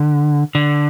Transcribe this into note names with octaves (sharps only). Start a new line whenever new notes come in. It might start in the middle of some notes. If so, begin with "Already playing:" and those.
Already playing: D3
D3